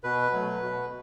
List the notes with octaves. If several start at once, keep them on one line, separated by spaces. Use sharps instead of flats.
B2 B4
F#3 A3
B2